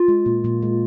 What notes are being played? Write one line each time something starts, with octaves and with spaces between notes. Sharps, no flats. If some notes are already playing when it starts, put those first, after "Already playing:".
Already playing: F4
G#3
A#2 A#3
A#2 A#3
G#3